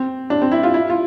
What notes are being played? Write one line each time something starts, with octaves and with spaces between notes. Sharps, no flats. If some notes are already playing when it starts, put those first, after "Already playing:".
Already playing: C4
D4
C4
E4
F4
E4
F4